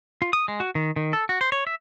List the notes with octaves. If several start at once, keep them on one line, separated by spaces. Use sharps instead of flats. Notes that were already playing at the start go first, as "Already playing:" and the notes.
F4
D#6
G#3
F#4
D#3
D#3
A4
F#4
C5
C#5
E5